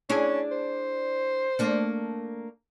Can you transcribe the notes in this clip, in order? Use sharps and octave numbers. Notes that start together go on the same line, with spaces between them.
C#4 D4 E4 G#4
C5
A3 A#3 D4